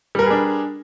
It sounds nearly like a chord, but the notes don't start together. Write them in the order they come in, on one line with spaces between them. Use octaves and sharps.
G3 A#4 B4 G#4 D4